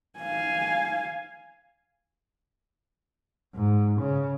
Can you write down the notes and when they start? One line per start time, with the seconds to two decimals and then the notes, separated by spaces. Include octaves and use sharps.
0.19 F5 G#5
3.55 G#2
4.01 C#3